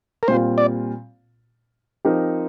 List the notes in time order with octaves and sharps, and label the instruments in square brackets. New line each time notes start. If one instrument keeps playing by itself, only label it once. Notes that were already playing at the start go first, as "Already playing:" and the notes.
[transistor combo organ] A#4
[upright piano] A#2 G3 C4 F4 [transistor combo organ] C5
[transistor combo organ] D5
[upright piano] F3 C4 D#4 G4 A#4